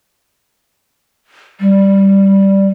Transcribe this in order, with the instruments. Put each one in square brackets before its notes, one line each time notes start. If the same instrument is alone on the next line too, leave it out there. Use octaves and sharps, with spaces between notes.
[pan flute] G3